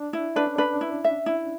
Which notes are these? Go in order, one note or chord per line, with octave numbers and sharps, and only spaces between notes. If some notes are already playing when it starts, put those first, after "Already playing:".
Already playing: D4
E4
D4 B4
C#4
D4 B4
E4
E5
E4